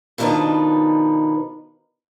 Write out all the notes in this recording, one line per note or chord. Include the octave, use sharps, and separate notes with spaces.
B2 D#3 F3 D4 D#4 B4